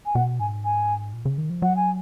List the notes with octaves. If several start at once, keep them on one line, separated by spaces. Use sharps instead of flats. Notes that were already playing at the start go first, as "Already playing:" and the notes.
G#5
B2 F#5
G#2 G#5
G#5
A#2
C#3
D#3
F3
F#3 F#5
G#5